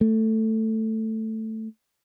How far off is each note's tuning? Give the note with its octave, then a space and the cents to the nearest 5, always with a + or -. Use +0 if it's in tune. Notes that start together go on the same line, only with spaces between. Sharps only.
A3 +5